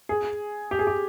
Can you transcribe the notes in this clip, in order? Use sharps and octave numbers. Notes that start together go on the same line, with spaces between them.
G#4
G4
G#4
G4